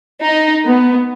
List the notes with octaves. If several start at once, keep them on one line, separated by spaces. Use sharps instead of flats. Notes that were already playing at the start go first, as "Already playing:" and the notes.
D#4
B3